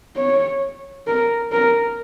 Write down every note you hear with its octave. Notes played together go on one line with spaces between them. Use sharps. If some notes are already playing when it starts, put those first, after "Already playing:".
C#5
A#4
A#4